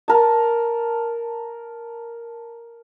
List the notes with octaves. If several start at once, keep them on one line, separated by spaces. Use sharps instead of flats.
A#4 A5